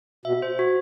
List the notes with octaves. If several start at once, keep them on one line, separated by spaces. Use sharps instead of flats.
B2 E5
C5
F#4